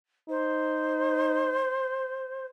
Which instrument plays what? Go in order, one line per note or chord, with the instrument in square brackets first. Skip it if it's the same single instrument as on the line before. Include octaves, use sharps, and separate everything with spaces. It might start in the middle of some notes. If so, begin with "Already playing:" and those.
[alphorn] D#4 [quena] C5